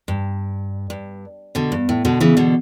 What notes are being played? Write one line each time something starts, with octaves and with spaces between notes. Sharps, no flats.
G2
G2
B2 D3
G2
A2
B2 D3
C#3 E3
B2 D3